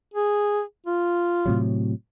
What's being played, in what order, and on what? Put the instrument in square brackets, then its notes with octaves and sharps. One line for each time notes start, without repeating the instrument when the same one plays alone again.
[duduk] G#4
F4
[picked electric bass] A2 C3 F#3